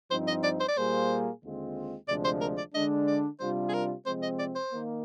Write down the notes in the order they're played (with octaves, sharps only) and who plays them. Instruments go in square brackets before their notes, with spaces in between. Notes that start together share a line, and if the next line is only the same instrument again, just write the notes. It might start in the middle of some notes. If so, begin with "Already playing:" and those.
[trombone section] G2 F3 C4 D#4 [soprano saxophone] C5
[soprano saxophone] D#5
D5
C5
D5
[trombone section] A#2 G3 A#3 F4 G#4 [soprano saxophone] C5
[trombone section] D#2 D3 G#3 C4 F4
[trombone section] D2 C3 F3 G#3 D4 [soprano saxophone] D5
[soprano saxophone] C5
A#4
D5
[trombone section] D3 G#3 D4 [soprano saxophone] D#5
[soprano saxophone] D5
[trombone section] C3 G3 D4 F4 [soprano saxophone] C5
[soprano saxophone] G#4
A#4
[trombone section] C3 F3 G#3 C4 [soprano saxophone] C5
[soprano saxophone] D#5
D5
C5
[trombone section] D#3 A#3